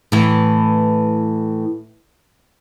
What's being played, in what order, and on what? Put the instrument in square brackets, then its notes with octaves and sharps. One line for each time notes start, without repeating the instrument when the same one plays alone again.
[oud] A2 E3